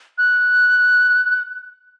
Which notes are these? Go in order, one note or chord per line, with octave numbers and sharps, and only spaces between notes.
F#6